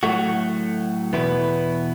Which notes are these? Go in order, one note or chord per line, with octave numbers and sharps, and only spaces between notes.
A2 F#3 A3 F#4
E2 B2 B3 E4 B4